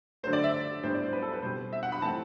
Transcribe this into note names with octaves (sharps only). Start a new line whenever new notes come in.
D3 F#3 A3 C5
D5
E5
A2 G3 B3 D4 C5
D5
C5
B4
A4
B4
B2 G3 C4 C5
E5
F#5
B5
E3 A3 C4 A5